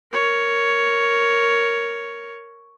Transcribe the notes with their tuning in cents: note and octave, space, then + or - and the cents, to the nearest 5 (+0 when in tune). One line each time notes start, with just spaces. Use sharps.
A#4 +0 C#5 +5